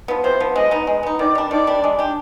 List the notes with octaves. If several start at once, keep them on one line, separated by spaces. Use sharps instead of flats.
F3 B3
C3 C5
F3 B3
G#3 D#5
B3 D#4
G#3
B3 D#4
D#3 D5
G3 D4
D#3 D5
G3 D4
G#3
D4 G4